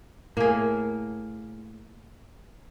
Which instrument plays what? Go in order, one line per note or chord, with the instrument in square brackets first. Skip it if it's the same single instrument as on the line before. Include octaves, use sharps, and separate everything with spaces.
[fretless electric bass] A2 [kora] A#3 G#4